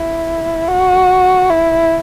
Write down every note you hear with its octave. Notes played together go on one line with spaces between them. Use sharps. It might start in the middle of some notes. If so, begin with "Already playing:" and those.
Already playing: E4
F#4
E4